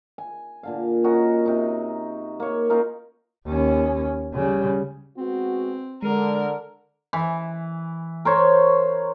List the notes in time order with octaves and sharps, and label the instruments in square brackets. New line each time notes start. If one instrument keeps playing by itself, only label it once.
[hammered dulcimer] G#5
A#2 D3 F5
C#4 F#4 A#4 D#5
C3 D#4
A#3 C#5
C#4 D#4 F4 A#4
[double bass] D#2 C#4
C#3 G3
[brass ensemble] G#3 B3 F#4 [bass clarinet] C4
[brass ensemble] D3 [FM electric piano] G#3 [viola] A#4
[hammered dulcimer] E3
A#4 C5 C#5